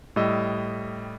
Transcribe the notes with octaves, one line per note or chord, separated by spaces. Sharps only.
A2 G3 D#5 E6